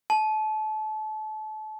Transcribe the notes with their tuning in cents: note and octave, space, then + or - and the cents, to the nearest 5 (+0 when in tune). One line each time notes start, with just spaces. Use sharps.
A5 -30